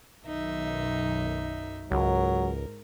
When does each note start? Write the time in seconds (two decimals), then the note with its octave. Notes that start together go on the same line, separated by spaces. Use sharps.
0.25 B1 F#2 D#3 D#4 E5
1.91 C#2 G#2 F#3 A#4